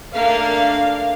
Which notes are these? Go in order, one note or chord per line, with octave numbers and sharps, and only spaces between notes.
A3 A#3 D4 A#4 F5